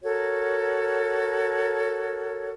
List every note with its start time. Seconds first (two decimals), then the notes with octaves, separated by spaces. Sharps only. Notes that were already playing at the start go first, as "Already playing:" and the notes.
0.02 F#4 A4 A#4 C#5